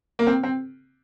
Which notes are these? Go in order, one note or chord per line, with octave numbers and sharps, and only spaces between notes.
A#3
C4
C4